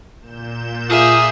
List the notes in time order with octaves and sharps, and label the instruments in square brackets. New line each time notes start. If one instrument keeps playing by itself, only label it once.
[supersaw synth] A#2 G6 E7
[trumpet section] A#3 F5 D#6 [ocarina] F4 [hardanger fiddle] G#4 E5